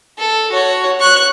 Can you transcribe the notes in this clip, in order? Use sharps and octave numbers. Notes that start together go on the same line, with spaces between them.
A4
F#4 C#5
C#6 F#6